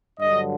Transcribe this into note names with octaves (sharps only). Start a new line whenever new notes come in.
G2 D3 F#3 D#5